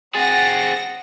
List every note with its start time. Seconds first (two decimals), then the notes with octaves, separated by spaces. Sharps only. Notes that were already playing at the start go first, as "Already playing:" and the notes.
0.15 C4 G#4 F#5 A6 A#6